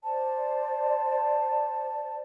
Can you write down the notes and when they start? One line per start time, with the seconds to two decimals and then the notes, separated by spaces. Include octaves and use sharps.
0.04 C5 D5 A5